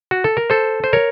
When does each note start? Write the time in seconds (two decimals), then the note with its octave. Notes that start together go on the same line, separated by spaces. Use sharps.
0.11 F#4
0.24 A4
0.37 A#4
0.50 A4 C5
0.84 C5
0.93 A#4 C#5